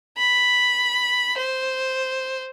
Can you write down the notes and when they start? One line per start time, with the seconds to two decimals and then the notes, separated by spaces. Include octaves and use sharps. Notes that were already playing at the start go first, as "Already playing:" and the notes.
0.18 B5
1.37 C5